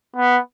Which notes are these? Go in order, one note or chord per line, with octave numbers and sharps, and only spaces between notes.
B3